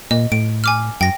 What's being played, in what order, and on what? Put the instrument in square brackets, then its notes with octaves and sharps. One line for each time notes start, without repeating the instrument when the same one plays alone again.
[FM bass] A#2 [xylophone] D#5
[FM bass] A2 [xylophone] D7
[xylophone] G#5 D6 F6
[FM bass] F#2 [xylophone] G5 A#6